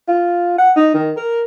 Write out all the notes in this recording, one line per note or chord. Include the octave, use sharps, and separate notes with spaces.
F4
F#5
D#4
D#3
A#4